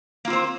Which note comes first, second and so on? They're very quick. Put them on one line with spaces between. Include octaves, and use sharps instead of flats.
A#3 F4 C4 C5